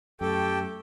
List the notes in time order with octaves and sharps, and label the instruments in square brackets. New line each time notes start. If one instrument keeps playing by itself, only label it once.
[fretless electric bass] F#2 [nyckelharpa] A3 [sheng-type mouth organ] G4 A4 [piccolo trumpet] G5